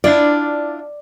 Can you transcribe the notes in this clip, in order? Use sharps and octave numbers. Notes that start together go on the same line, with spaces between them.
D4 E4 F4 D5